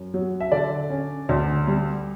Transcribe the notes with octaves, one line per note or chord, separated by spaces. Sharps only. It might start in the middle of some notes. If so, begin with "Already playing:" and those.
Already playing: F#2
F#3
E5
D3 D5
C#4
D2
G3